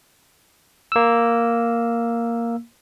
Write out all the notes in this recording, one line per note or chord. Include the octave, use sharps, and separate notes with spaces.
A#3 E6